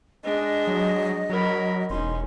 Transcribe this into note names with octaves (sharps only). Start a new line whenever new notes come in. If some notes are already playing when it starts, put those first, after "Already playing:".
G#3 D4 D#5
F#3
F#3 A#4 B5
E1 C#4 D#4 C6